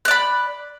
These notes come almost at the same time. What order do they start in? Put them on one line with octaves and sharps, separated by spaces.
F#6 D5 B5